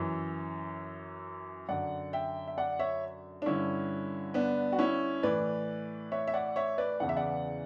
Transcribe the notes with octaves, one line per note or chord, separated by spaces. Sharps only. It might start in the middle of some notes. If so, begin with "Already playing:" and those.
Already playing: F#2 E3
F#2 D3 D5 F#5
E5 G5
E5
D5 F#5
C#5 E5
D4
G2 D3 C#4 E4
B3 D4
F#4
C#4 E4
A2 E3 B4 D5
C#5 E5
E5
D5 F#5
C#5 E5
B4 D5
E2 C#3 E3 F#5
E5
D5 F#5